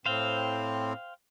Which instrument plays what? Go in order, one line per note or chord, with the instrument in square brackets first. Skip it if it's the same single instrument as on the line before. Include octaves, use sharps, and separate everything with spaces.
[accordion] A2 C4 [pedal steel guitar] C5 F5 G5